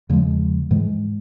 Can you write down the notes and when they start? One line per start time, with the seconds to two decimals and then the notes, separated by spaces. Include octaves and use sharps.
0.09 E2 C#3 F3 G#3
0.71 G#2 E3 G#3